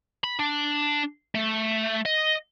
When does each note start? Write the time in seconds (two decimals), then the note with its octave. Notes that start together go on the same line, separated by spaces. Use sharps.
0.24 B5
0.40 D4
1.35 A3
2.05 D#5